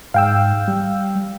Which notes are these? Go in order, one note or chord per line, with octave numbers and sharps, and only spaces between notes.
G#2 F5 G5 E6
G3